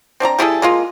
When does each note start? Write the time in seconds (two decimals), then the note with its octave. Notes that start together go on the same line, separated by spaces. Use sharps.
0.20 C4 D4 D5 A#5
0.39 G3 E4 G#4 A4
0.62 G#3 A#3 F4